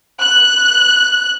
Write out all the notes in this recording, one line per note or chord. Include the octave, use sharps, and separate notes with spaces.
F#6